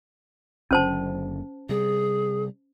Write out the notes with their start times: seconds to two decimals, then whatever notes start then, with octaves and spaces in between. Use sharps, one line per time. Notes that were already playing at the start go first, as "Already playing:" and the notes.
0.71 F#1 F#2 D3 C#4 C5 A5
1.69 C3 G3 G#4